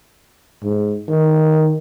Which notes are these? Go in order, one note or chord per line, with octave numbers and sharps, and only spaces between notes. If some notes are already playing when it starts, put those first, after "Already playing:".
G#2
D#3